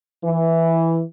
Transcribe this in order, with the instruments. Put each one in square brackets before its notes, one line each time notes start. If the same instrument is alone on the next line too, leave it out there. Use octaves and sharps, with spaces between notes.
[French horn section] E3